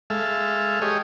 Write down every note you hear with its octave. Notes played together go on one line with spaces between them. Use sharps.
G#3 A4 E5 F5
G4 G#4 C#5 D#5